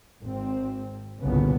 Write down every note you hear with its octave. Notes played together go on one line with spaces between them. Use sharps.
G#1 C4
G1 C2 A#2 C#3 B3